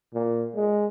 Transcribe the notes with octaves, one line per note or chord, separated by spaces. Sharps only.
A#2
G#3